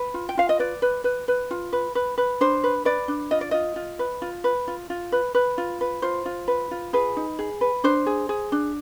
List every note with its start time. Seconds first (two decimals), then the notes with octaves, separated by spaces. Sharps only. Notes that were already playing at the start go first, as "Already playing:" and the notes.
Already playing: B4
0.14 F4
0.29 G5
0.37 F4 F5
0.49 D#5
0.59 B4 D5
0.82 B4
1.04 B4
1.28 B4
1.51 F4
1.73 B4
1.95 B4
2.18 B4
2.41 D4 C5
2.64 B4
2.85 B4 D5
3.08 D4
3.31 F4 D#5
3.41 D5
3.51 F4 D#5
3.76 F4
3.99 B4
4.22 F4
4.44 B4
4.68 F4
4.90 F4
5.12 B4
5.35 B4
5.58 F4
5.81 B4
6.02 F4 C5
6.26 F4
6.48 B4
6.71 F4
6.93 G#4 B4
7.17 D#4
7.39 G#4
7.61 B4
7.84 D4 C5
8.06 G#4
8.29 G#4
8.52 D4